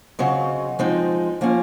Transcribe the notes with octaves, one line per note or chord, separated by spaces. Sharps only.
C#3 F#3 C4 D#5
F3 G#3 C4 D#4
F3 A#3 C#4